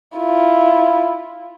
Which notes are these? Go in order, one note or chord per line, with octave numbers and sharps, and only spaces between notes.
E4 F4